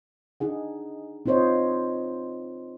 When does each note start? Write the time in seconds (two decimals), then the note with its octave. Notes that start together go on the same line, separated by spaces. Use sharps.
0.40 D4 D#4 G#4 F#5
1.26 C4 D#4 F4 C5 C#5 D#5